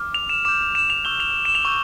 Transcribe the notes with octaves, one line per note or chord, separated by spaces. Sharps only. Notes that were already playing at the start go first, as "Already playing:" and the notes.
Already playing: D6 F6
F7
E7
D6 G6 E7
E7
F7
C#6 E6 G6 G7
F7
E7
F7
C#6 E6 G6